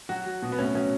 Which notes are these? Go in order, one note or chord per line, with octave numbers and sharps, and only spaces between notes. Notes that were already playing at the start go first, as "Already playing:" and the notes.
F#3 F#4
F#3
B2
B3
A2 C#4
F#3 C#4